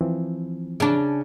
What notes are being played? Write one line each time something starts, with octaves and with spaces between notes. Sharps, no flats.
E3 F3 C4
C#3 D4